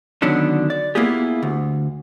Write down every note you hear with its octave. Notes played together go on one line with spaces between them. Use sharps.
D3 D#3 F#3 B3 C#4 D4
D5
A#3 B3 E4 F4 G4 G#4
D2